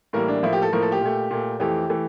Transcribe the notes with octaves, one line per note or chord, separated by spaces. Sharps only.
A2 E3 G3 A#3 A#4
D4
A2 F3 A#3 E4
G4
A4
A2 F3 A#3 A#4
A4
G4
A#2 A3
A#2 A3
F2 E3 A3 G4
E3 A3